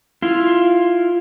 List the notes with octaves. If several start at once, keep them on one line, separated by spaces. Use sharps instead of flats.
E4 F4